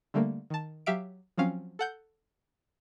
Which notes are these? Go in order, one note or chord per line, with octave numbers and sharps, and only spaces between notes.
D3 G3 A3 A#3
D#3 A5
F#3 G4 E5 F5 D7
F3 F#3 C4 C#4 F5
A4 F#5 G6